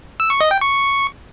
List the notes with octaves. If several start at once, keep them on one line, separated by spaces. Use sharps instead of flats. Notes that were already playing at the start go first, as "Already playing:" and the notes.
E6
C#6
D#5
G5
C#6